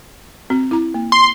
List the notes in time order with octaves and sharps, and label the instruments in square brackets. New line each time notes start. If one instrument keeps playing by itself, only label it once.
[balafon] C4 F#4
E4 A#5
A#3
[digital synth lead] C6